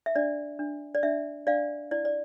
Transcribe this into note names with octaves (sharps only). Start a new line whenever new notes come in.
E5
D4 D5
D4
D5
D4 E5
D4 D5 F5
E4 D5
D5